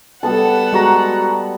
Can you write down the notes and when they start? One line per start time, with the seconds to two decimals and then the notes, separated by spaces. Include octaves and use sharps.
0.23 G3 B3 A4 F#5 A5
0.73 G#3 F#4 A#5